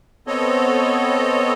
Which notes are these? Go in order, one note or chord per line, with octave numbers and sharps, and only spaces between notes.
B3 C4 A4 C#5 D#5